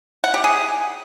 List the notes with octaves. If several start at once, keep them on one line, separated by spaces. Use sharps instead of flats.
F#5
G4
G#4